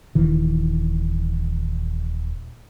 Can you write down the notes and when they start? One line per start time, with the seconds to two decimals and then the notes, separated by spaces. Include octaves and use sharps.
0.15 D#1 D#3 E3